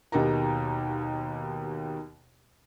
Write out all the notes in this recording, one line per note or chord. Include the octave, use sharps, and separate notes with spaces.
D#2 B2 D#4 G4 A#4 A#5